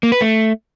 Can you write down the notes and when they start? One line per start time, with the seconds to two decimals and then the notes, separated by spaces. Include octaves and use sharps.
0.03 A#3
0.12 B4
0.21 A3